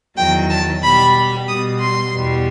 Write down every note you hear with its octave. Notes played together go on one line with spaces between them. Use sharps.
E2 D#3 F#3 G5
A5
B2 G3 B5
B2 G3 D#6
C6
E2 B2 G3